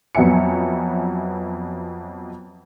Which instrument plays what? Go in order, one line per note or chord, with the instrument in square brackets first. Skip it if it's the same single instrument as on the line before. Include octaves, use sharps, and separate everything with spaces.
[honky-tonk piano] F2 F#3 B3 E5 G#5 C#7